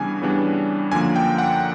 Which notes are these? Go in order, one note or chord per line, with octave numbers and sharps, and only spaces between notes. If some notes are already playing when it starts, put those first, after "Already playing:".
Already playing: C#3 E3 G3 B3 D4 G#5
C#3 E3 G3 B3 D4
F#2 D3 F3 A#3 G#5
G5
F#5